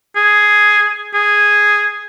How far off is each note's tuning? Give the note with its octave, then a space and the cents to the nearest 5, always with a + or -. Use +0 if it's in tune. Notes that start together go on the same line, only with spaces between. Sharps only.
G#4 +5
G#4 -5